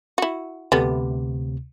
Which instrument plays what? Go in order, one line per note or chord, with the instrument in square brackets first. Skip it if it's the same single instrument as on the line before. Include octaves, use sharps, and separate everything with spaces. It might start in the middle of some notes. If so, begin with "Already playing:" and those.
[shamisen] E4 F#4
[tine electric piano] D2 C3 [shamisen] G3 A3 B3